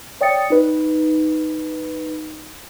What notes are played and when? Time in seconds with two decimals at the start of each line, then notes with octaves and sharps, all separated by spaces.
0.21 C#5 D5 G5 D#6 A6 C#7
0.50 D#4 B4